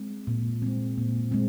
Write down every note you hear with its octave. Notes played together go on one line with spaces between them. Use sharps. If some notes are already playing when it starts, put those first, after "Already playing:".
Already playing: G#3 C4
A#2
G#3 C4
A#2
G#3 C4